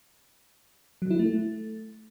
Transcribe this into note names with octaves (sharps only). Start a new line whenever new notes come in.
F#3
E4
A3